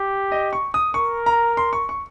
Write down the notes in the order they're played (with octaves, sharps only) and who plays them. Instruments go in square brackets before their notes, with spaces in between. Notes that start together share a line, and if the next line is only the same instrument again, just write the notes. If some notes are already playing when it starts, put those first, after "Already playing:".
Already playing: [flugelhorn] G4
[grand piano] D#5
C#6
D#6
[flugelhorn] A#4 [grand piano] C#6
[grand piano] A#5
C6
C#6
C#6